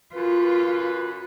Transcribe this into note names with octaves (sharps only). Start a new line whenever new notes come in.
F#2 F4 B4